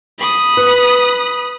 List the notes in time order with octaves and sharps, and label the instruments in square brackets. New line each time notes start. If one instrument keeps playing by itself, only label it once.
[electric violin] B5 D#6
[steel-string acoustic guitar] B4